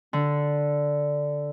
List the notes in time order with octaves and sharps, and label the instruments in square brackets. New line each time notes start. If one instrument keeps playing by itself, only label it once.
[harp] D3